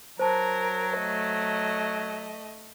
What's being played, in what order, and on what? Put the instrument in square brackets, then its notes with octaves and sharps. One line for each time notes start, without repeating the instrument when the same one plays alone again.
[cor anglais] F#3 [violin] A#4 [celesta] C5 A5
[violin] A3 D#5